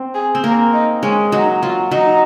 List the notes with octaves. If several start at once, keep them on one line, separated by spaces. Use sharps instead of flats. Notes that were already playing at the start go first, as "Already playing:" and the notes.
Already playing: C4
G#4
C4
A#3 A#4
D#4
G#3 C#4
F#3 D#4
F#3 F4
F#3 D#4